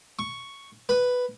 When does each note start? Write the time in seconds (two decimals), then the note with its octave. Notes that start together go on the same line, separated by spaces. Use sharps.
0.19 C#6
0.89 B4